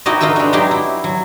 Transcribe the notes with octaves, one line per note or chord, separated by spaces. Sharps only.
D#4 E4 F#4 G4 D#5
D#4 F4 A4 B4 E5
G#3 D4
F#3 D#4 E4 G4 C6
E4
F#3